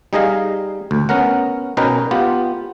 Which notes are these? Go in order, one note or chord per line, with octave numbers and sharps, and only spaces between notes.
G3 D#4 G#4 D#5 F5
D2
B3 C#4 A#4 F#5
B2 C#4 D#4 A#4 B4 G5
B3 F4 G4